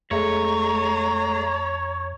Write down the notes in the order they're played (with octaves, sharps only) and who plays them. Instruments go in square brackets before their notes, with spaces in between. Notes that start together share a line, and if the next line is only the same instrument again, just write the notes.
[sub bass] F2 [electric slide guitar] G#3 A3 [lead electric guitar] C#5 [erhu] A#5